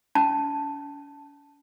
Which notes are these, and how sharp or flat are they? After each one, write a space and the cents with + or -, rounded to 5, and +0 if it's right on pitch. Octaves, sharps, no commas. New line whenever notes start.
C#4 +45 A5 +0